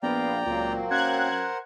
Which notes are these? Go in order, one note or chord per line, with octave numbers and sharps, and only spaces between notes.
A#1 B3 D5 F5 G5 A#5
C#2 A#2 F#3 A#3 C4
F#2 A#4 C5 F#5 F#6 G#6